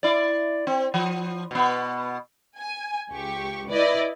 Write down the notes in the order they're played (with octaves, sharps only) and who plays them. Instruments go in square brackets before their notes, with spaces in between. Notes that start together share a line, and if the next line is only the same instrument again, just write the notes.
[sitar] E4 D5
C4
F3
B2 B3
[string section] G#5
C#2 G4 C#6
E4 B4 D5 D#5